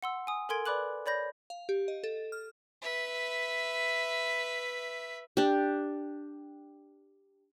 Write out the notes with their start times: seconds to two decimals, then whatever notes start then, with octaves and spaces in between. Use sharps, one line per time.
0.02 F#5 C6 E6
0.27 G#5 D#6
0.49 A4 A#4 G#5 C6 G#6 D7
0.66 B4 D5 B5 D6 F#6 F#7
1.06 C#5 D5 B5 G6 A#6
1.50 F5
1.69 G4
1.88 D#5
2.04 A4
2.32 F6
2.82 B4 E5
5.37 D4 G4